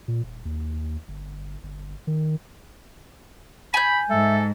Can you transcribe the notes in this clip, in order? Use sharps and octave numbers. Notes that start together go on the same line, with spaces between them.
A#2
D#1
D#2
G1
G1
D#3
G#5 B5 G6
G#2 A4 E5